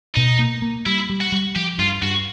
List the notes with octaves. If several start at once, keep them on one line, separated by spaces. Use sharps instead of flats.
B2 D#4
A#3
A#3
G3 E4
G3
F#4
G3
F3 G4
G2 F4
G2 F#4